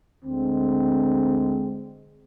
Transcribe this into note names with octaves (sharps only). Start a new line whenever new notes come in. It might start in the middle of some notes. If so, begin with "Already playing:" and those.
D2 D3 G#3 C4